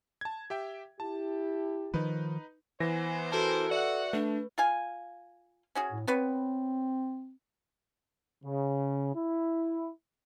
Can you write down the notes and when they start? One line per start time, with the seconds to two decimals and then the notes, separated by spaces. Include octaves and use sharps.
0.21 A5 G#6
0.50 G4 E5 G5
1.00 E4 G4 A5
1.94 D#3 F3 D#4 B4
2.80 E3 B3 C5 G#5 A#6
3.32 C4 F#4 A4 A#4 C5 A5
3.70 F#4 B4 D5 E5 F#5
4.13 A3 D4 B4
4.58 F4 F5 G#5
5.75 C#4 F#4 G#4
5.92 A2
6.07 B3 C4 B4 C#5
8.44 C#3
9.15 E4